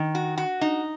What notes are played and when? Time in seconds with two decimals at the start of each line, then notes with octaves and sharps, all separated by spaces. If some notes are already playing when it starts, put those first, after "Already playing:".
Already playing: D#3
0.15 F#4
0.38 F#4
0.61 D#4